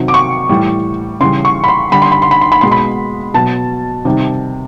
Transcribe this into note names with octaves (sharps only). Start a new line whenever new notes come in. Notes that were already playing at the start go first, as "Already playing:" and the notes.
Already playing: C3 D#3 F#3
D6
C#6
A2 E3 G3
C#3 E3 G3 C6
C#6
B5
C6
D3 G3 B5
C6
B5
C6
B5
C6
B5
B2 G#3 C6
B5
B2 F#3 A5
C3 D#3 G3